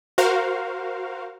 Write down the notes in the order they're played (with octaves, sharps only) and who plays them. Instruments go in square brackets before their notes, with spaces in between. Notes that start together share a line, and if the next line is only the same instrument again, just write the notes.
[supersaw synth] F#4 A#4 C5 F5